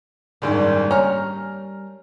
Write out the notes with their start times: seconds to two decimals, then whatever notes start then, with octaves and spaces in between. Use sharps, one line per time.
0.42 F#1 G#2 D#3 G3 A#3 D4
0.91 C#4 A#5 F6